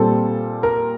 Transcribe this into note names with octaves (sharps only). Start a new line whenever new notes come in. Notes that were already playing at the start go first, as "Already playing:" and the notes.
Already playing: A#2 G3 C4 A4
A#4